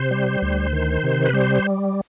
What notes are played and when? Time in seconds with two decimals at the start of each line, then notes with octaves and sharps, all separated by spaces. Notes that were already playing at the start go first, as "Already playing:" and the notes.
Already playing: C3 C5
0.11 G3
0.42 D2
0.73 D#3
1.03 C3
1.25 B4
1.33 G3 C5